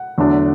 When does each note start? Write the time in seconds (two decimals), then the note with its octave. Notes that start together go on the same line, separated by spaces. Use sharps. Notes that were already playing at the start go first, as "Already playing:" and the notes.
Already playing: F#5
0.18 E2 D3 F#3 A3 D4